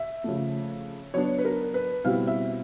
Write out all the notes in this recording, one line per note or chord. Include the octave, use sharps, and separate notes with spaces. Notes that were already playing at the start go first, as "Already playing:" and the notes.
Already playing: E5
C#3 F3 A3
F#3 B3 D4 C#5
B4
A#4
B4
B2 G3 C4 E4 F5
E5